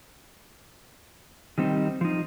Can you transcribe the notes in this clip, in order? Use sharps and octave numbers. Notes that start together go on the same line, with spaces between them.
D#3 G3 C4 D#4
F3 D#4